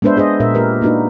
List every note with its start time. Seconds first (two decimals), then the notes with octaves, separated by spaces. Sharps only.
0.02 G#3 B3 D4 B4 C5 E5
0.16 D4 G#4 C5 D#5
0.40 A#2 A#4 E5
0.55 A#3 G4 A#4 B4
0.81 A#3 D4 D#4 F#4 B4